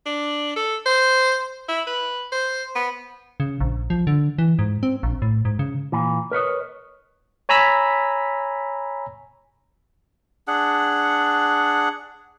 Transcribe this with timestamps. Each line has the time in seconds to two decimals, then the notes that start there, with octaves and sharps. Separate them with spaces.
0.06 D4
0.56 A4
0.86 C5
1.69 E4
1.87 B4
2.32 C5
2.75 B3
3.40 C#3
3.60 A#1
3.90 F3
4.07 D3
4.39 E3
4.59 G#2
4.83 C4
5.03 A#1
5.22 A2
5.45 G#2
5.59 C#3
5.92 A#2 E3
6.31 A#4 B4 C#5 D#5
7.49 C#5 G#5 A#5 B5 E6 B6
10.48 D4 G#4 F#5